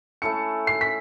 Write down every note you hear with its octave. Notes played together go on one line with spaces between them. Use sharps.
A3 C#4 E4 A4 C#7
C7
B6